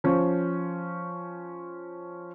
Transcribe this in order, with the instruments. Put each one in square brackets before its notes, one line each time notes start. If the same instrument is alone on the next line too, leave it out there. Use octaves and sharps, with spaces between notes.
[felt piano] F3 C#4 C5